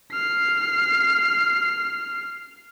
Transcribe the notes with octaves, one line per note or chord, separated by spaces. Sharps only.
F6 C7